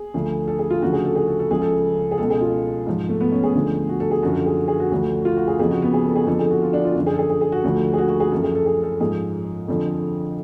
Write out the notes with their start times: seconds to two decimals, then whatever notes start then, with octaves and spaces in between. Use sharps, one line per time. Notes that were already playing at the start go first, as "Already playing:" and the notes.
Already playing: G#4
0.14 D2 D3 F3
0.48 A4
0.59 G#4
0.70 F4
0.82 D2 C#3 F3 F#4
0.93 G#4
1.04 A4
1.16 G#4
1.28 A4
1.40 A4
1.50 C#2 C#3 F3 G#4
1.62 A4
2.11 G#4
2.18 C#2 B2 A4
2.30 G#4
2.41 F4
2.86 G#2 F3
3.09 A3
3.21 B3
3.32 C#4
3.43 G#4
3.55 D2 D3 F3
3.89 F#4
4.00 A4
4.11 G#4
4.23 F#2 D3 F3 F#4
4.34 A4
4.46 G#4
4.68 G#4
4.80 F#4
4.91 D2 D3 F3
5.25 F4
5.36 F#4
5.47 G#4
5.59 F2 C#3 F3 G#4
5.71 F#4
5.82 B3
5.94 G#4
6.05 A4
6.16 G#4
6.27 F2 D3 F3 A4
6.39 G#4
6.51 F#4
6.62 F4
6.73 D4
6.85 F4
6.95 F#2 D3 F3
7.06 G#4
7.14 A4
7.19 G#4
7.30 G#4
7.41 G#4
7.52 F#4
7.64 D2 D3 F3
7.93 G#4
7.98 F#4
8.09 F#4
8.20 G#4
8.32 F#2 F3 A4
8.44 G#4
8.55 A4
8.66 G#4
8.83 A4
9.00 G#2 F3 G#4
9.68 F2 D3 F3